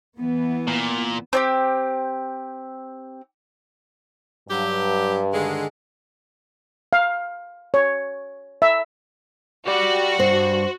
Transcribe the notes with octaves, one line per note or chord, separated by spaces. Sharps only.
E3 B3
A#2
C4 D4 G4
G2 F#3 G4
D3 D#3 G#3
F5
C#5
E5
F#4 G4 D5
G2 C5